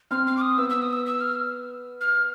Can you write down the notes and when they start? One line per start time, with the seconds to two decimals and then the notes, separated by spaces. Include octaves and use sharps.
0.11 C4 F6
0.27 F6
0.37 D6
0.41 D#6
0.58 B3 E6
0.69 E6
0.82 D#6
0.93 E6
1.06 E6
1.21 F6
2.01 F6